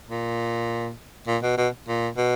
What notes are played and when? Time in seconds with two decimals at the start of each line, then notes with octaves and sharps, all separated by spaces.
0.08 A#2
1.27 A#2
1.43 B2
1.58 B2
1.88 A#2
2.17 B2